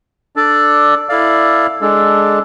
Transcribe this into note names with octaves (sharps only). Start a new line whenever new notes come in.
D4 A4 D5
E4 A4 D5 F5
G#3 D4 A4